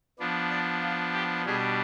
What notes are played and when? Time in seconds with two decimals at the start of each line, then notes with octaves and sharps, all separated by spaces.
0.19 F3 B3 D4
0.50 D5
0.83 F4
1.13 G4
1.45 B2 G3 D4 G#4